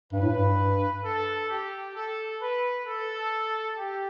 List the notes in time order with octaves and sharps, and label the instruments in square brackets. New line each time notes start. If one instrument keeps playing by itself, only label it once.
[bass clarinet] G2 [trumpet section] B4
[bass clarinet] A2
G2
[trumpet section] A4
G4
A4
B4
A4
G4